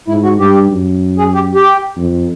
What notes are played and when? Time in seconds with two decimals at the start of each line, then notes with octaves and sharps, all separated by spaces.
0.08 G#2 E4
0.24 F#4
0.39 G2 G4
0.71 F#2
1.18 G#4
1.34 G4
1.55 G4
1.97 F2